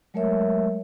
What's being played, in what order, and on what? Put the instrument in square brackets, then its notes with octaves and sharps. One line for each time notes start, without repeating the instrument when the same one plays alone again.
[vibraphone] F#3 G#3 A3 A#4 C#5 E5